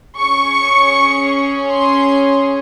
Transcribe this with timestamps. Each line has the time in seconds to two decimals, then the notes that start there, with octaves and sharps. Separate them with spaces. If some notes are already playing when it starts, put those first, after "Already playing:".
0.17 C#4 G#4 C#6
1.66 C6